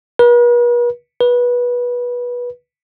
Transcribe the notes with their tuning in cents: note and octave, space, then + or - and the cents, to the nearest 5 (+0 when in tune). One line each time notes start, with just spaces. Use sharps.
B4 -45
B4 -20